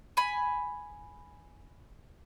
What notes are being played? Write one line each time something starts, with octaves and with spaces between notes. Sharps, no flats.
G#5 B5